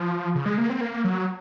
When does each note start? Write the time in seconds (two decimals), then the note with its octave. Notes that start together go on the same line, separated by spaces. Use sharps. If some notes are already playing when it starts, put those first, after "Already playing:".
Already playing: F3
0.35 C#3
0.46 G#3
0.58 A#3
0.70 C4
0.81 A#3
1.04 F#3